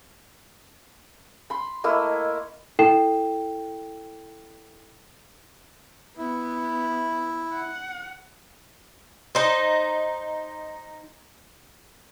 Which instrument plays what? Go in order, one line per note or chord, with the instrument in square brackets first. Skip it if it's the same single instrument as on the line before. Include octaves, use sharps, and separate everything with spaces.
[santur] B5 C6
[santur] A3 A#3 E4 [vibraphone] D#5
[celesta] E4 A4 G5 C7 E7
[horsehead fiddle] B3 [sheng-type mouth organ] E4
[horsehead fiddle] F#5
[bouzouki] D#4 C5